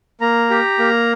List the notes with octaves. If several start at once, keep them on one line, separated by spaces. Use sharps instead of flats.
A#3 A#5
G4
A#3